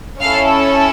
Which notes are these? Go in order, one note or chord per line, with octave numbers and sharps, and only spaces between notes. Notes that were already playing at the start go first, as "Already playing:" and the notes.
C#4 E4 A4 F5